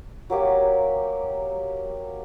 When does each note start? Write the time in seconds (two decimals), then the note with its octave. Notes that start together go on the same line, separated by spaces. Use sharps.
0.30 F#3 A#3 G4